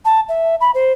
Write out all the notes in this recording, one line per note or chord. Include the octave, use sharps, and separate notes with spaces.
A5
E5
B5
C5